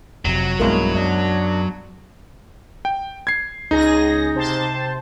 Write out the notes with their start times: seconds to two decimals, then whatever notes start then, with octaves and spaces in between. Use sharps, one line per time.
0.25 F1 F2 C3 F#3
0.60 B1 G2 B2 G#3 A#3 E4
0.95 F#2 D4
2.85 G5
3.27 G#6 C7
3.71 C#2 D#4 G#4 A#6
4.35 C3 C5 A5